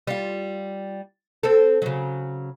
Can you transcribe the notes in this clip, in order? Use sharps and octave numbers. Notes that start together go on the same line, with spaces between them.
G3 F4
C4 A4
C#3 F#3